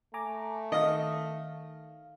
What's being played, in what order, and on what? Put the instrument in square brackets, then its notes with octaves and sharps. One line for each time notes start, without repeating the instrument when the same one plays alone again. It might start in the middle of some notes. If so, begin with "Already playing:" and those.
[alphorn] A3 [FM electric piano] G#5 A#5 D6
[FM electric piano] D#3 F5 [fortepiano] D#5